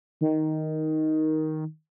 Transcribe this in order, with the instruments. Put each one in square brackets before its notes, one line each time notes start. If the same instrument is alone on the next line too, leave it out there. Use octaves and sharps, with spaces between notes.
[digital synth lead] D#3